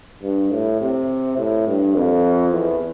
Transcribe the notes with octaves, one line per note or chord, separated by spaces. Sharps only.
G2
A2
C3
A2
G2
F2
E2